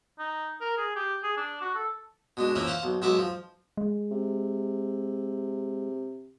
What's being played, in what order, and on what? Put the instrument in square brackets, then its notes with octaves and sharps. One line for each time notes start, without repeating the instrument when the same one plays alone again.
[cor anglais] D#4
A#4
G#4
G4
G#4
D4
F#4
A4
[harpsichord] B2 G#3 D4
E3 F3 A#3 C#4 E5
C5 F5 F#5 C6
B1
B1 G#3 F#4 E5 F#5 D6
F3
[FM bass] G#3
[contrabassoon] C3